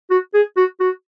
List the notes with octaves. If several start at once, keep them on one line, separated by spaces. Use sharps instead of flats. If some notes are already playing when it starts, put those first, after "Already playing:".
F#4
G#4
F#4
F#4